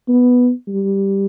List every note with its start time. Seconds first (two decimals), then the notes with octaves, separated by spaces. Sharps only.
0.09 B3
0.68 G3